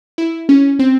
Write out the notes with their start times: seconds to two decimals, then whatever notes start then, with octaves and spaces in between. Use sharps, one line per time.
0.18 E4
0.49 C#4
0.79 C4